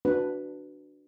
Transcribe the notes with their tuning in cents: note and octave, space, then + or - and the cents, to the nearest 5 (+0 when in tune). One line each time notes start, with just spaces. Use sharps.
D4 +0 F#4 -5 B4 +0